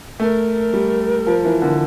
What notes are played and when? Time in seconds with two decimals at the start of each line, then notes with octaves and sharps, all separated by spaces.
0.20 A3 A#4
0.73 G3
1.27 F3
1.45 E3
1.62 D3